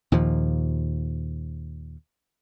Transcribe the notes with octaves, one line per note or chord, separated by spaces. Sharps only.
D#2 A#2 F3